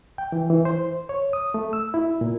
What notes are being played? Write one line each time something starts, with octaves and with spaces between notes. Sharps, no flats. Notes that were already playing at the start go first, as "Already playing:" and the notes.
G5
E3
E3
C5
C#5
D#6
A3
E6
E4
A#2